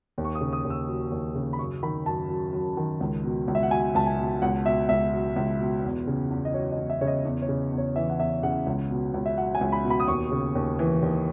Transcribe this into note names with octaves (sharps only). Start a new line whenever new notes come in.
D#2
C#6
D#6
C#3
D#6
D#2
E6
F#3
D#2
C#3
B5
F#2 C#6
D#3 B5
F#2 A5
F#3
F#2
D#3
C#2
B2
C#2
E5
F#5
F#3 G#5
C#2 A5
G#5
B2
C#2 F#5
B2 E5
C#2 E5
F#3
C#2
B2
E2
C#3
E2
D#5
F#3 C#5
D#5
E2
E5
C#3 C#5
D#5
E2
C#5
C#3
E2
C#5
E3 E5
F#5
E2 E5
C#3 F#5
C#2
B2
C#2
E5
F#3 F#5
G#5
C#2
B5
B2
B5
D#6
D#2 C#6
C#3
D#2
E3
D#2